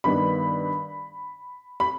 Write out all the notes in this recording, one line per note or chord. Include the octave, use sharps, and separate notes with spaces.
G2 D#3 B3 D4 B5
B5